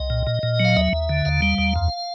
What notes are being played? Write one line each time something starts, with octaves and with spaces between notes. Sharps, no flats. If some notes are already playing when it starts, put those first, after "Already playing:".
Already playing: C2 D#5
A#2
A#2
A#2
F#3
F5
D#2 E5
D#2
D3
D#2 F5
G3
D#2
F2